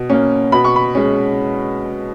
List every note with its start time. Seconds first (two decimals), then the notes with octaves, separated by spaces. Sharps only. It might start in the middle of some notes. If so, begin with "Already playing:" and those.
Already playing: B2
0.10 A#3 C#4
0.52 B2 B5
0.64 C#6
0.76 B5
0.95 G#3 C#4